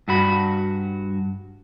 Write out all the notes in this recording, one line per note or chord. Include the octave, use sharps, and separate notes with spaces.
G2 F#4 B5